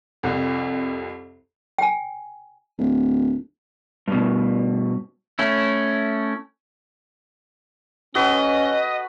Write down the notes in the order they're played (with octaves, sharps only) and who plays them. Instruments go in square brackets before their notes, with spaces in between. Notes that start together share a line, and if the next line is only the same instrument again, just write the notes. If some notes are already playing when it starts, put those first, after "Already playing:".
[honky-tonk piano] C2 F2
[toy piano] G5 G#5
[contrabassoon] D1
[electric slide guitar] G2 B2
[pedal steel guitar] A3 C#4 E4
[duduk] C#4 [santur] F#4 A4 B4 [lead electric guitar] D#5